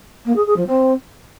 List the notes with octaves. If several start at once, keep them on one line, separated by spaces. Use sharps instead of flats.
A#3
G#4
G#4
F3
C4